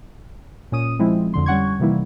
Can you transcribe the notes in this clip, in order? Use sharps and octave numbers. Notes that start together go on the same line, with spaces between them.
A#2 C#4 D#6 D#7
F3 G#3 C4 E4
F2 D3 C6
G3 C#4 F#5 C#6 G#6
C3 D#3 E3 G3 A#3 E4